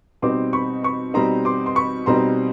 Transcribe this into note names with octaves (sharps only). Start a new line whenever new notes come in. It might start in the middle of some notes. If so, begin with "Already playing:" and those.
B2 G3 C4 D#4 C6 D6
B5 C#6
B5 C#6
B2 G3 C4 D#4 A#5 C6
C6 D6
C6
B5 C#6
B2 G3 C4 D#4 A#5 C6